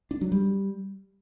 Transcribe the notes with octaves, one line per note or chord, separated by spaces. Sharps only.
D4
F#3
G3